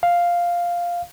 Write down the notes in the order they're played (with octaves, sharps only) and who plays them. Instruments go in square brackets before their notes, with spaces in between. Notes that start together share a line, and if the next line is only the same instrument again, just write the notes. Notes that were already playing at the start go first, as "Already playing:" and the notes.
[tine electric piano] F5